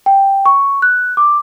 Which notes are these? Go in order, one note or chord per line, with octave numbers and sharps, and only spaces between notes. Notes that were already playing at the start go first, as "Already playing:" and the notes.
G5
C#6
F#6
D6